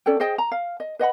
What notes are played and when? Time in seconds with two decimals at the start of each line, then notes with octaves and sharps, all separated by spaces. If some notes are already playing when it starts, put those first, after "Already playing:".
0.06 C#4 A4 D5 G5
0.20 G#4 C5 D#5 G5
0.38 A#5
0.52 F5
0.80 D#5
0.99 B4 D#5 F#5 B5